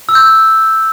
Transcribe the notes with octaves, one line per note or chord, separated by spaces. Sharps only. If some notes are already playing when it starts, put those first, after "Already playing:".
E6
G6